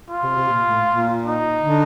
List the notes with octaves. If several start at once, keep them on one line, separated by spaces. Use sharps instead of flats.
F4
C3
C3
A#2
A2
A#2
D#4
D3